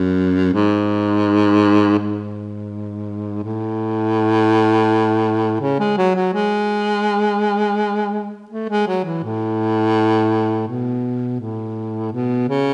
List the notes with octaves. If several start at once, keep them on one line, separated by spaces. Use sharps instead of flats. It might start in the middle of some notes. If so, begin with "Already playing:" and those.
Already playing: F#2
G#2
G#2
A2
C#3
G#3
F#3
F#3
G#3
A3
G#3
F#3
E3
A2
B2
A2
B2
C#3